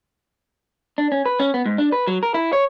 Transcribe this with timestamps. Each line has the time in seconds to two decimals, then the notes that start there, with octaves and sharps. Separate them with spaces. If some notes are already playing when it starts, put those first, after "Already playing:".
0.98 D4
1.12 C#4
1.26 B4
1.39 C#4
1.54 B3
1.66 G#2
1.78 D4
1.92 B4
2.07 F#3
2.23 A#4
2.34 E4
2.53 C#5